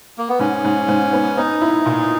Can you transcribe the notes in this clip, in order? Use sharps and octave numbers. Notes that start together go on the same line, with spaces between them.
A#3
B3
G#2 C#4
G#2
G#2
B3
B3 D#4
E4
A#2